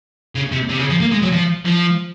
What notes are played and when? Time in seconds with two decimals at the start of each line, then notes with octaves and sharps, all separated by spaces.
0.35 C#3
0.52 C3
0.69 C3
0.79 C#3
0.90 F3
1.00 A#3
1.11 G#3
1.22 F#3
1.33 F3
1.66 F3